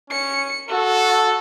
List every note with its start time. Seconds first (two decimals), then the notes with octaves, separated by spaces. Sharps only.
0.10 C#4 C#7
0.69 F#4 A4